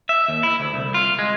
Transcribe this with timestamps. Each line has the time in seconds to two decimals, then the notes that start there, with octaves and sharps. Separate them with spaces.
0.09 E5
0.28 D#2
0.43 E4
0.60 D2
0.74 C2
0.94 F4
1.19 G#3